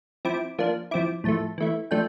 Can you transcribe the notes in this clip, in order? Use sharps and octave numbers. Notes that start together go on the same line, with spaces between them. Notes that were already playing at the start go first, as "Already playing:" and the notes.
F3 C4 E4 D6
F3 A#3 D4
F3 C4 E4 D6
A2 F3 A3 A5
E3 A3 E4
F3 A3 D4 G5